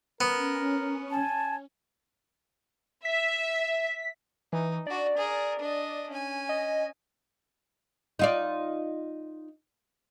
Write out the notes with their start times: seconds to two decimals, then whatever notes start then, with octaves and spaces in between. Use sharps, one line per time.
0.21 B3 C#4 A#4
1.11 G#5 A5
3.05 E5 B6
4.53 E3 D#4
4.87 D4 F#4 D5
5.17 G#4 A#4
5.60 D4 D#5
6.10 C#4 G#5
6.49 D#5
8.19 D#4 F4 D5